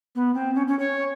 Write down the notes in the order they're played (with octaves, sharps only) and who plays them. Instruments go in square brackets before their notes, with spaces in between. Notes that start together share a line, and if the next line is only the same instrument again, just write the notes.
[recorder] B3
C4
C#4
C#4
C#5